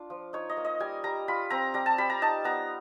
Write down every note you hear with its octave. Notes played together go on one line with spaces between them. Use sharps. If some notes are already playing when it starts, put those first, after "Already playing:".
Already playing: D4 F4
F3
D#4 C#5
D#5
A#3
D#5
G3 G#5
G3 A#5
F4 B5
C4 A#5
G3 A#5
A5
G3 B5
A#5
D#4 A5
B3 A#5